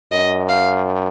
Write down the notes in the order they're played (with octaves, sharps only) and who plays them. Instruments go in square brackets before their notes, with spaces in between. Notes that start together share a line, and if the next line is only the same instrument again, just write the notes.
[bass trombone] F#2 [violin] D#5
[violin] F5